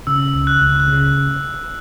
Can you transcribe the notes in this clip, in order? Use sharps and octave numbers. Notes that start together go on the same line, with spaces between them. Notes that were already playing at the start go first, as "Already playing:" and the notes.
C#3 E6
C#2
F#6
C#2
F#6
C#3